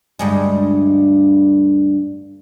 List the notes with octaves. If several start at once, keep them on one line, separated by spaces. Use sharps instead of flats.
D2 G2 G#3